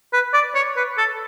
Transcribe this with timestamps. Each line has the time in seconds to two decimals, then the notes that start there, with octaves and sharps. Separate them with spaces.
0.13 B4
0.33 D5
0.55 C#5
0.76 B4
0.98 A4